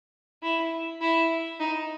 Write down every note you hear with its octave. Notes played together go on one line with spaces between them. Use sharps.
E4
E4
D#4